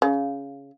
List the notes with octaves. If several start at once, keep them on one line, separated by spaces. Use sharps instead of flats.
C#3